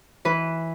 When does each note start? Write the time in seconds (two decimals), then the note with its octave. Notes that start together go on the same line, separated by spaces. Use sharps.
0.25 E3 B4